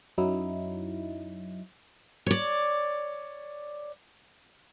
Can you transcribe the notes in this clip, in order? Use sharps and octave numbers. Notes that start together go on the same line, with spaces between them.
F#2 F#3 D#4 E4
C#5 D5